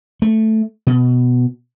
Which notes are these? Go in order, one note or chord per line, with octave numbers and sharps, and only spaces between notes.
A3
B2